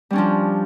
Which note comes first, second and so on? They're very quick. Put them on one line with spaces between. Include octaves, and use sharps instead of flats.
G3 C#4 D4 F3